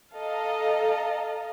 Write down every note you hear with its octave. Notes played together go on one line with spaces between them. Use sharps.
A4 D#5 F5 A5 A#5